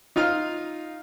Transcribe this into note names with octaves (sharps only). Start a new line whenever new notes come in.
D#4 F4 F5 F6